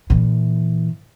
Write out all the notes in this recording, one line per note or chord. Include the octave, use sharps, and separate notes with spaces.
A#2 E3